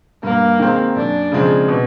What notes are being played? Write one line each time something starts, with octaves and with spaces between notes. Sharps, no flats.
G2 A#3
D#3 G#3 C4
F#2 D4
C#3 F3 G#3 C4
B2